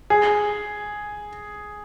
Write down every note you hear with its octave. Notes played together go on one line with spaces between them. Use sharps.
G#4